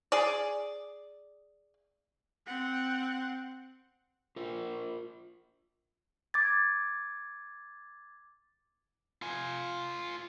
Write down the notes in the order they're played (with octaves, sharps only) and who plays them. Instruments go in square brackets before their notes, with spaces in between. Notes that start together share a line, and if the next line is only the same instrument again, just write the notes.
[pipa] G#4 D5
[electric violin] C4 F#5
[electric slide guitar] F4 A#4 C5
[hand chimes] D6 G#6 A6
[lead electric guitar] F4 G#5